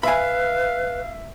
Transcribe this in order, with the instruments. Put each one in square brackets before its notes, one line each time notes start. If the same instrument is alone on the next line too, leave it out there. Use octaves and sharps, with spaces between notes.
[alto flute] B4 [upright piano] E5 [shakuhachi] F5 [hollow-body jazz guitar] G#5 B5